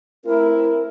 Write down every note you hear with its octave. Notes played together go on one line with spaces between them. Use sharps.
A3 C4 E4 A#4